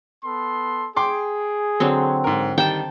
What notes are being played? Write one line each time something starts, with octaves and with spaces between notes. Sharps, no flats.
B3 A4 C6
G#4 G5 C6 D6
D3 F#3 C4
G#2 A#4
D#3 G3 G5 A5